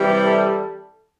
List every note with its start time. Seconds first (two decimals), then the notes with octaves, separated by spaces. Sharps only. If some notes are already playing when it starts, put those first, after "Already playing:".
Already playing: C3 E3 G3
0.21 A4